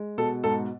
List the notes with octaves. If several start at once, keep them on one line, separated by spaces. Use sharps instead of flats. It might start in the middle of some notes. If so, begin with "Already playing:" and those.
Already playing: G#3
B2 A4
G#2 A4